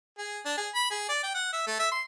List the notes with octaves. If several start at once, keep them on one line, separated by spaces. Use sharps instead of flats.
G#4
D4
G#4
B5
G#4
D5
G5
F#5
E5
A3
E5
C6